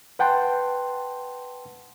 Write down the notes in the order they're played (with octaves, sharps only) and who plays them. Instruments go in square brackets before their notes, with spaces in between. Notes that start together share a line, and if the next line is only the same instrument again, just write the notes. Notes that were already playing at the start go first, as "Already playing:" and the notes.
[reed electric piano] B4 F#5 G5 A5 C6